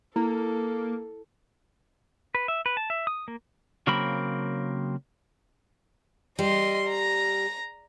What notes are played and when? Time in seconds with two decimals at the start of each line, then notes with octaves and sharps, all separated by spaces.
0.16 A#3 E4 A4
2.35 B4
2.48 E5
2.66 B4
2.77 A5
2.90 E5
3.07 D#6
3.28 A#3
3.87 C#3 F#3 A#3 C4 A#4 B5
6.39 G3 D#5 C6
6.88 A#5 A#6